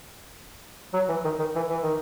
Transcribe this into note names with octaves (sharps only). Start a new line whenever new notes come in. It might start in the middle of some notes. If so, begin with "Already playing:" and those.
F#3
E3
D#3
D#3
E3
E3
D#3